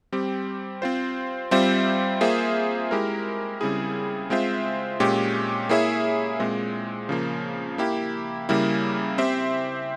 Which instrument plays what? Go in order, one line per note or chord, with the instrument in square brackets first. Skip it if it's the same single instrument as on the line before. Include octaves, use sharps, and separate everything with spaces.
[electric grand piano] G3 C4 G4
C4 F4 C5
G3 C4 F4 C5 E5
A#3 F4 G#4 C5 E5
G#3 E4 G4 A#4
C#3 G3 C4 E4 G#4
G#3 C4 F4 C5 E5
A#2 G#3 C#4 G4
A#3 E4 G#4 C#5 E5
A#2 G#3 C4
C#3 F3 A#3
A#3 E4 G4
C#3 G3 A#3 E4
C4 G4 C5 E5